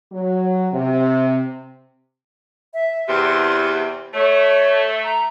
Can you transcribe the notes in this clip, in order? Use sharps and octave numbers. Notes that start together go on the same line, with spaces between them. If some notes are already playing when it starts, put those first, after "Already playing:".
F#3
C3
E5
E2 C3 C6
A3 C#5
A#5